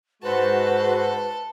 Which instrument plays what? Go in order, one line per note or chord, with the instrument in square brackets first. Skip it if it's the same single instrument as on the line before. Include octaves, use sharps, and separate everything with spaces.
[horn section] G#2 G#3 C5 [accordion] F#4 [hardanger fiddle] A4 A5 [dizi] B4